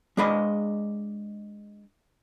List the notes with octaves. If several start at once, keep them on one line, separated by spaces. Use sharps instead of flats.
G#3 D4 G#4 D#5 B5